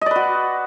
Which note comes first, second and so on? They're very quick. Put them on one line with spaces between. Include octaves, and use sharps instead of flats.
D#5 D5 B4 F#4